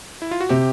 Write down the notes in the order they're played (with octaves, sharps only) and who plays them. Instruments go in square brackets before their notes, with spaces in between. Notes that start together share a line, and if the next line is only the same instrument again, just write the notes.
[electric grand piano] E4
F4
F#4
[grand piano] C3 [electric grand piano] G4